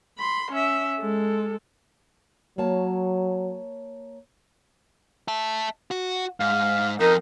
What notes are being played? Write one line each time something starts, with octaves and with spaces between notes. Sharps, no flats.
B5 C6
C#4 E5
G#3 A4
F#3 A#3 C#5 A5
E5 A5
F#4
G#2 F5
F2 D#4 A#4